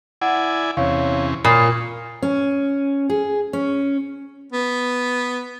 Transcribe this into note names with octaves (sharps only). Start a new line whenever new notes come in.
E4 D5 F#5 G#5
E2 C3 C#4 C#5 F5
A#2 F4 C#5 B5 D#6 C7
C#4
G#4
C#4
B3